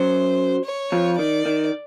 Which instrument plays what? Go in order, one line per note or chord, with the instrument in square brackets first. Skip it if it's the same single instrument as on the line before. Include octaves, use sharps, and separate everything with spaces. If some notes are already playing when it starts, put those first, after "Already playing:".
Already playing: [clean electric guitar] F#2 F#3 [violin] C5
[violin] C#5
[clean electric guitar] F2 F3
[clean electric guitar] D#3 [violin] D5
[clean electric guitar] D#3